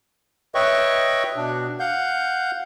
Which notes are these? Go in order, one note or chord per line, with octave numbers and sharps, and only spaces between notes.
B4 C#5 D#5 E5 G5 C#6
B2 D4
F5 F#5 G6